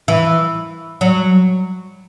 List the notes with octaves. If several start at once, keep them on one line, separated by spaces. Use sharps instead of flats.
E3
F#3